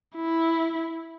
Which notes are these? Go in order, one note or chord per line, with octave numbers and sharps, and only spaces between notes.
E4